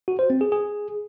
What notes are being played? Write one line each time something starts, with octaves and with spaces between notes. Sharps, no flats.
F#4
C5
C4
G#4
G#4